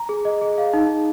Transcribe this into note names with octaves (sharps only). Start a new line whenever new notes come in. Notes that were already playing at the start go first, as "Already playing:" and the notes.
Already playing: A#5
G#4
D#5
G#4
F5
D#4
G#4